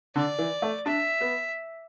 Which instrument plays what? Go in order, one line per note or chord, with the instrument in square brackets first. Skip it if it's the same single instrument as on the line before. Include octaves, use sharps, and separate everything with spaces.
[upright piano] D3 [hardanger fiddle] D5
[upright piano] E3
A3
[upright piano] D4 [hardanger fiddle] E5
[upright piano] B3